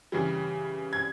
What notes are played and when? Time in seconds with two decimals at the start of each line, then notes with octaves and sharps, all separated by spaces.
0.12 C#3 E3 G3
0.93 G#6